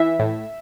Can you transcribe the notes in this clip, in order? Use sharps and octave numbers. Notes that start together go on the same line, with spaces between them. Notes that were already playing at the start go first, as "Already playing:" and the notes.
Already playing: E3 E5
A2